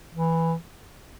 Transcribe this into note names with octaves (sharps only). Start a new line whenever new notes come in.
E3